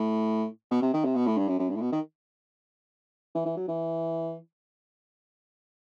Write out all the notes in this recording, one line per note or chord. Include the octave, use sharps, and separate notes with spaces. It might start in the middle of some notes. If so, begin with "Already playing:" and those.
Already playing: A2
B2
C3
D#3
C3
B2
A2
G2
F#2
F#2
G2
A2
B2
D#3
E3
E3
F#3
E3